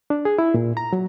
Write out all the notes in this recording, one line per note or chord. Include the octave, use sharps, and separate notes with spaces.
D4
G#4
E4
A#2
A#5
F#3